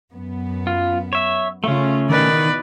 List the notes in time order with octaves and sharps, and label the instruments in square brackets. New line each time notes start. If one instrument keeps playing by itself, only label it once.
[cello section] F#2 B3
[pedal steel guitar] F4
C#5 E5
[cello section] C#3 F4 [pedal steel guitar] A3 C#4
[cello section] B2 E3 D#4 [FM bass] D#3 [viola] B4 D5